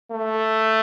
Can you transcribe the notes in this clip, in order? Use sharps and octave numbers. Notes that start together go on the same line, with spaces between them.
A3